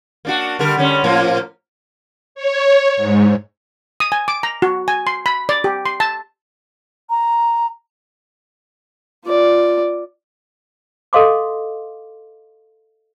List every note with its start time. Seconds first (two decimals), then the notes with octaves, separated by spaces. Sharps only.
0.25 A#3 D4 F#4
0.59 D3 G3 A#4
0.77 D3 G3 C#4
1.04 A2 F3 A#3
2.35 C#5
2.97 G#2
4.00 D#6
4.12 G#5
4.28 D6
4.43 A#5
4.62 F#4
4.88 G#5
5.07 C6
5.26 B5
5.49 D5
5.64 G4
5.86 C6
6.00 A5
7.10 A#5
9.25 F4 D5
11.13 A4 D#5 F5 C6 D6